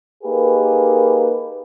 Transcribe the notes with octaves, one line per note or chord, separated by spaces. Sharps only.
A#3 D#4 G4 G#4 A#4 B4